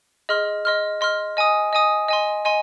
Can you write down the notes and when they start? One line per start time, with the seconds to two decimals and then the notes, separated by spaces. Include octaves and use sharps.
0.29 G#4 D#5 C6 F6
0.65 D#5 C6 F6
1.01 D#5 C6 F6
1.37 D#5 G#5 D#6
1.73 D#5 G#5 D#6
2.08 D#5 G#5 C6
2.45 D#5 G#5 C6